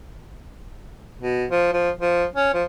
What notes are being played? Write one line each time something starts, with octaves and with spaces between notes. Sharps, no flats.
B2
F3
F3
F3
C#4
F3